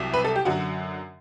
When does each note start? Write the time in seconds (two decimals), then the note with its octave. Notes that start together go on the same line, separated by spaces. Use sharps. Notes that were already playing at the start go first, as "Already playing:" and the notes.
Already playing: C2 C3 F#3
0.13 B4
0.25 A4
0.36 G4
0.45 F#2 D3 F#3 F#4